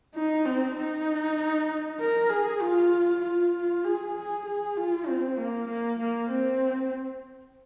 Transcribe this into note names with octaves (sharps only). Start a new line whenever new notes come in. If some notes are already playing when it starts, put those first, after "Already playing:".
D#4
C4
D#4
A#4
G#4
F4
F4
G#4
G#4
G#4
F4
C4
A#3
A#3
A#3
C4